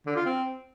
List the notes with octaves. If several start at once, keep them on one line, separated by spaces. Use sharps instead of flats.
D3
F4
C4